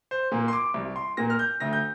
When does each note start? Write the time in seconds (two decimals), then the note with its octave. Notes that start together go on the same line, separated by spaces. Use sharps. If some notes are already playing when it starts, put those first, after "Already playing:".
0.11 C5
0.32 A#2 A#3
0.48 C6
0.53 D6
0.74 C2
0.96 C6
1.17 A#2 A#3 A#6
1.30 F6
1.39 G6
1.60 D2 A#6
1.73 G6